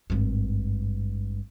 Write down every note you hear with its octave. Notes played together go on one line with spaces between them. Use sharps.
G#1 G2